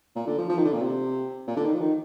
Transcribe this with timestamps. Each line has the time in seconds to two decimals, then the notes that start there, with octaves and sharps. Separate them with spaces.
0.16 A#2
0.27 D3
0.38 F3
0.50 F3
0.58 D#3
0.65 D3
0.74 A#2
0.82 C3
1.48 A#2
1.57 D3
1.66 D#3
1.73 F3
1.81 D#3